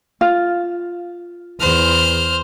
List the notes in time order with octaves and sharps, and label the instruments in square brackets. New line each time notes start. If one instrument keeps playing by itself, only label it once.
[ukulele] F4
[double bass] E2 [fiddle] C5 F6